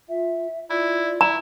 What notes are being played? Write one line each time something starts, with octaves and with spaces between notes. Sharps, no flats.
F4 E5
E4 F4 D5
E4 A#5